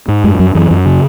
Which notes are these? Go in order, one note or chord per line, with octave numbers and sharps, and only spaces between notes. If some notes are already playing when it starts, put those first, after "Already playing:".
G#2
F#2 G#3
F#2 F#3
F#2 E3
F#2
C#3